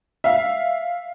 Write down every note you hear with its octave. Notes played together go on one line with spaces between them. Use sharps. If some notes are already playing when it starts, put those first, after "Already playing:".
E5 F5